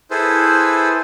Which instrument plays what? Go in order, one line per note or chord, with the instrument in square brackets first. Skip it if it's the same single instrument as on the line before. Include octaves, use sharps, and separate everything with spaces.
[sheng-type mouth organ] E4 G#4 A4 B4 C5